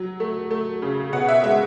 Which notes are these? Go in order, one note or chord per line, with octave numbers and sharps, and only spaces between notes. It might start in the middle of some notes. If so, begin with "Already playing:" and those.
Already playing: F#3
A3
A3
C#3
B2 F#5
E5
G#3 E5